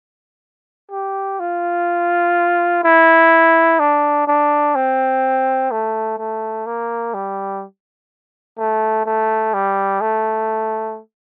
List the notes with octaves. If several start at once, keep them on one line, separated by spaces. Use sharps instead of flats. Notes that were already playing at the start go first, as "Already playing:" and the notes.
G4
F4
E4
D4
D4
C4
A3
A3
A#3
G3
A3
A3
G3
A3